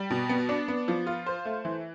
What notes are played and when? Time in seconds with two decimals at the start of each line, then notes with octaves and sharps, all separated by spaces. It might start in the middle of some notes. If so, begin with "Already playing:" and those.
Already playing: G3
0.10 B2
0.29 B3
0.49 D4
0.68 B3
0.88 F3
1.07 F4
1.26 C5
1.45 A3
1.65 E3